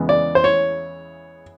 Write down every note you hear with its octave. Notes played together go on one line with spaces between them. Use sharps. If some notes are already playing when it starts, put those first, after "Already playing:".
Already playing: E2 C#3 E3 G#3 B3
D5
C5
C#5